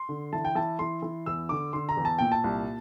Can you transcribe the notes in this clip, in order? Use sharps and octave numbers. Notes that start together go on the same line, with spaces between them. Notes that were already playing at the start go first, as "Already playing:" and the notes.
Already playing: C6
D3
E3 A5
G5
E3 A5
E3 C6
E3
E2 E6
D3 D6
D3 C6
A#5
E2
A5
A#2 G5
A5
C2